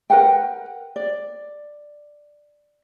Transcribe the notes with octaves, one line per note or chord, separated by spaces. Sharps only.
A#4 B4 F#5 G5
D5